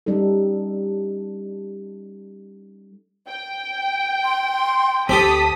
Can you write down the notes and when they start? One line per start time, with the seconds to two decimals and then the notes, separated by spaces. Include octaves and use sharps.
0.06 G3 C#4 D#4 A4
3.29 G5
4.24 C6
5.09 D2 C4 G4 A4 A5 D#6 B6